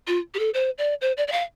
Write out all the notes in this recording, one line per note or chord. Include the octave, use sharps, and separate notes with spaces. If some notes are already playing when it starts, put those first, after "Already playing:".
F4
G4
A4
C5
D5
C5
D5
D5
F5